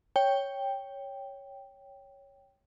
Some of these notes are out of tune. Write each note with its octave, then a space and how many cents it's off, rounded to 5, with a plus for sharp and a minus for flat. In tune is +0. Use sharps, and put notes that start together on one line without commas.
C#5 +0 G5 +0